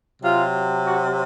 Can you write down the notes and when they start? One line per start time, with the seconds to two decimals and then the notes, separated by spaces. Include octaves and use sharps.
0.23 C3 F#3 F4
0.85 F#4